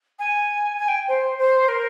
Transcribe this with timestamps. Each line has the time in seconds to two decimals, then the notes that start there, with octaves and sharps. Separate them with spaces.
0.19 G#5
0.78 G#5
0.88 G5
1.08 C5
1.38 C5
1.68 A#4